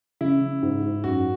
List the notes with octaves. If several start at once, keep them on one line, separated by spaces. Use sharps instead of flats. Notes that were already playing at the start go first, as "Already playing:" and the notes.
C#3 E4
C#3
G#2
G#2
F#2 F#4